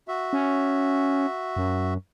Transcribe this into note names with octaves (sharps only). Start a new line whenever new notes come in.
F#4 E5
C#4
F#2